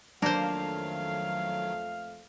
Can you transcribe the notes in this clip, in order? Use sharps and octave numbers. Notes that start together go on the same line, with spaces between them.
F2 D#3 F#3 A3 A#3 D4 C5 F5